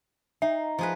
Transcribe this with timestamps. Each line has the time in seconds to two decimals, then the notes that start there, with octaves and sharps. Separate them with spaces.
0.42 D#4 E5
0.79 F3 G#4 B4